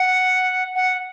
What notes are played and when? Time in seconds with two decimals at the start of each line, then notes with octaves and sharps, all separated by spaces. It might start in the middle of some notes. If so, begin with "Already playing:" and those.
Already playing: F#5
0.75 F#5